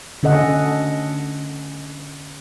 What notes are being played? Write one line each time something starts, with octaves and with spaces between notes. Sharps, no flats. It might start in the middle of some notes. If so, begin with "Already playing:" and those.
D3 C#4 A4 D#5 F#5